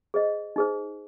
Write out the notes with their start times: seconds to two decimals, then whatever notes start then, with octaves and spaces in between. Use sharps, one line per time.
0.14 G#4 C5 D#5
0.56 D#4 G#4 C5